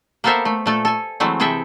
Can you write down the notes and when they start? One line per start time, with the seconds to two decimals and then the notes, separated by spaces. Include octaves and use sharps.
0.24 A#3 B3 A4 A#4 C5 E5
0.45 A3
0.66 A#2 A3 A4
0.85 A4 G#5
1.20 E3 F#3 G#3 A3 C4
1.40 C3 E3 G#4 A4 E5 G5